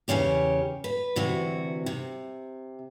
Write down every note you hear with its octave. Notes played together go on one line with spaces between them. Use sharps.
E2 G#2 C#3 C#4 G4
B4
D2 C3 E3 F#4
C3